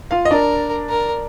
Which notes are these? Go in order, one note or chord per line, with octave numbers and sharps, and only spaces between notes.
F4 F5
D#5
D4 A#4 D5
A#4